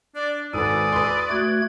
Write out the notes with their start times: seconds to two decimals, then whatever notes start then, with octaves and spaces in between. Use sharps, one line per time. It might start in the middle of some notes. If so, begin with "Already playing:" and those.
0.15 D4 D5
0.53 G#1 A4 B4 D5 G#5 D#6
0.92 B4 C6
1.30 A3 F#4 F#6 G#6